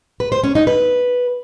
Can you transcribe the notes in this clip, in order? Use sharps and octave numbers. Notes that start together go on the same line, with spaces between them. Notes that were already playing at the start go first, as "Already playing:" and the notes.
B4
C5
C#4
D#4
B4